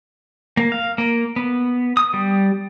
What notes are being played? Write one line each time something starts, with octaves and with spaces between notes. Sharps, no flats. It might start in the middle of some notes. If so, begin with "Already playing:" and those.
A#3
F5
A#3
B3
D#6
G3